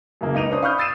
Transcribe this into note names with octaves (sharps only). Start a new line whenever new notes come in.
F#2 C#3 E3 A#3
C#2 D#4 D#7 F7
C#4 D4 C5 D#6
F5 B5 C#6 D#6 F6 G6
D#6 E6 A6 C7 D#7 E7